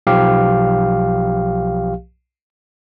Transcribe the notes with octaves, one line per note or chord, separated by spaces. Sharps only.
B1 F3 G4 F5